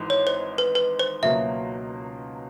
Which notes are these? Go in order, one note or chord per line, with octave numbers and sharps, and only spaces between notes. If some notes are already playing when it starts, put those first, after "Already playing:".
Already playing: G#1 G#2 E3
C#5
C5
B4
B4
C5
C#2 B2 F#3 A#3 E5